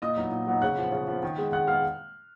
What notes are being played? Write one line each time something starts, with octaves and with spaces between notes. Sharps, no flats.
A#2 D#5 D#6
F#3 B3 D#4
A#2
F#3 B3 D#4
C#3 F#5 F#6
F3 B3
C#3
F3 B3
D#3
G#3 B3
D#3 F#5 F#6
G#3 B3 F5 F6